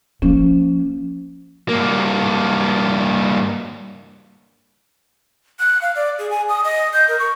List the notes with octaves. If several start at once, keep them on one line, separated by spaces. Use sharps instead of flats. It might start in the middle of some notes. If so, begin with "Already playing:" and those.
F3 A#3 C#4
G2 A#3
F#6
F5
D5
G#4
G#5
D#6
D#5
G6
A#4
C#6